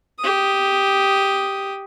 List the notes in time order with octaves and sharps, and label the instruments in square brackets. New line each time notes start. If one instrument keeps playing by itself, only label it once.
[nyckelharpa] G4 D#6